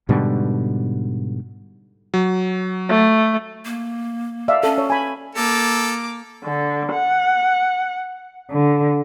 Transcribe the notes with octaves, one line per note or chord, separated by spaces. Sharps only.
G#2 B2 D3 G3
F#3
A3
A#3
D5 E5 F5
C#4 A4
C#5
G#5 B5
A#3 A4 D6
D3
F#5
D3